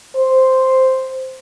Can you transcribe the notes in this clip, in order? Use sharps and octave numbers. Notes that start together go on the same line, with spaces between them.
C5